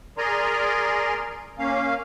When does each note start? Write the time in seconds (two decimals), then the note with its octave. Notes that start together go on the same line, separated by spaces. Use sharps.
0.18 G#4 A#4 D5 G#5 A#5 C6
1.59 A#3 C#4 F5